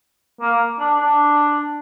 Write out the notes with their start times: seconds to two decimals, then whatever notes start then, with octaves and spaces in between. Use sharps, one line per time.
0.41 A#3
0.80 D4
0.98 D4